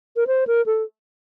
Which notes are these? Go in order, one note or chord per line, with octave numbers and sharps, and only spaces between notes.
A#4
C5
A#4
A4